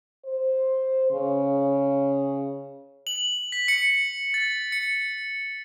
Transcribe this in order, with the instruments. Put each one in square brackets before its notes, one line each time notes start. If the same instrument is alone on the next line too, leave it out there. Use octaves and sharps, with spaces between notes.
[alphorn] C5
C#3
[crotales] F#7
B6
C#7
A6
C#7